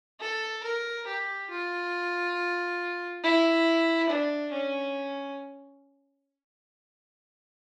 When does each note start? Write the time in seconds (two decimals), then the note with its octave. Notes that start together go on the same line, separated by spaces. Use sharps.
0.20 A4
0.63 A#4
1.07 G4
1.50 F4
3.24 E4
4.09 D4
4.52 C#4